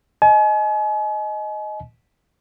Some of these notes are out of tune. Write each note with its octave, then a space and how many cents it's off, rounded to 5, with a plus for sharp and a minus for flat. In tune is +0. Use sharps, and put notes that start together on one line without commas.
D#5 +0 G#5 +40